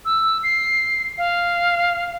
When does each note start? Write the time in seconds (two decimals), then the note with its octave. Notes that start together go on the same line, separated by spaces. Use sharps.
0.05 E6
0.43 C7
1.18 F5